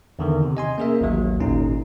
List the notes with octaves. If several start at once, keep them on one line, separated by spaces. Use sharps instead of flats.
E2 D3 D#3
C3
D#5 G#5 C6
A#3 C#4 G#4 A#4 E5
A1 D#2 F#3
G#1 A#2 C#4 D#4